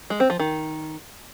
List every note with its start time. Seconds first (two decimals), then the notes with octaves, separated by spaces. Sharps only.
0.10 G#3
0.20 C4
0.30 F3
0.40 D#3